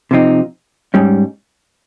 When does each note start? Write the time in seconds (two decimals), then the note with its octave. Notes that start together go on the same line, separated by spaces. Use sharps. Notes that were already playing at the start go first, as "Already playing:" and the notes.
0.11 C3 F3 C4 D#4
0.94 G#2 G3 C#4